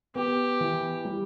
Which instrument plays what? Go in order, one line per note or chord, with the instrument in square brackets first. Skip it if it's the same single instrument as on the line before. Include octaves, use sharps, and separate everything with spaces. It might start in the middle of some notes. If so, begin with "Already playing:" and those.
[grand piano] B3 [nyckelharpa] G4
[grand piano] E3
G3